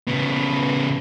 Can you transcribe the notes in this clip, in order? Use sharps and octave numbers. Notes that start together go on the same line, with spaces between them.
C#3 B3